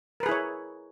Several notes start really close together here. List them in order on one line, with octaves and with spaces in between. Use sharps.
A#4 B4 G#4 E4 C#5